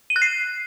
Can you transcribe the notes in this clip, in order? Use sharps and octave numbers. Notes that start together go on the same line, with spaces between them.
D#7
F#6
C7